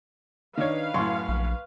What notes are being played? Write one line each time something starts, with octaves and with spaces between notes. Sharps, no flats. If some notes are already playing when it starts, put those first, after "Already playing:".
D#3 D4 B4 C#5 F5
F#2 A2 C6 C#6
A#1